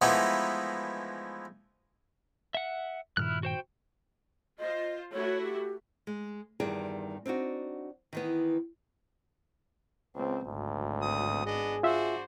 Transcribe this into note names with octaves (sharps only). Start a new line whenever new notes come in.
E3 F3 G#3 A3 B3 D#4
E5 F#5
G2 A#2 D#3 E4 F6 F#6
F#4 C5 G5
F4 C5 D#5
A3 E4 F#4 C#5
G4
G#3
E2 G2 D#3 G3 G#4 G5
C4 D4 D#4 F#4
D#3 E3 B3
C#2 C4
G#1 D2
B3 C4 D#6
B3 D4 G#4 D#5
D4 F4 F#4 C5 E5